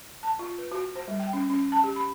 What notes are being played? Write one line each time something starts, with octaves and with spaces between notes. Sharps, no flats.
A5
F4
B4
F#4
C5
G3
G5
C#4
C#4
A5
G4
B5